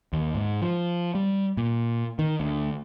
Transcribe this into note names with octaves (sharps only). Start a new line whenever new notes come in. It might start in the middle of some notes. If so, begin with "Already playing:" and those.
D#2
G#2
F3
G3
A#2
D#3
D2